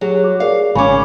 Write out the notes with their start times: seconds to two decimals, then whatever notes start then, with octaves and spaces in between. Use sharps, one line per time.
0.01 F#3 G4 G#4 C#5
0.24 F#4 D6
0.40 G#4 A#4 D5 F5
0.75 G#1 C#3 C#4 B5 C#6 D6